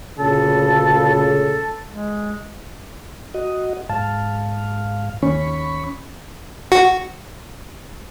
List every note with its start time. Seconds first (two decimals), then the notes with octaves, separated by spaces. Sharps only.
0.18 D2 A#2 C#3 A4
1.09 A4
1.88 G#3
3.34 F#4 D#5
3.90 G#2 F5 A5
5.22 D#2 C#4 B5 C#6
6.72 F#4